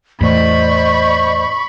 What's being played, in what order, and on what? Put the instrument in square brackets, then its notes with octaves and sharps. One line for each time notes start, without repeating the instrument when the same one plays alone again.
[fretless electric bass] E2 A2 [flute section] C5 D5 D#5 [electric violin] B5 C#6